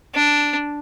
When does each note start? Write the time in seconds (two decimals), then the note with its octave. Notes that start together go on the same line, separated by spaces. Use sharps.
0.15 D4